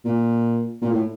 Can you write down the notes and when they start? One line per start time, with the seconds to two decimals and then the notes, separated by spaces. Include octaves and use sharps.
0.05 A#2
0.81 A#2
0.91 A2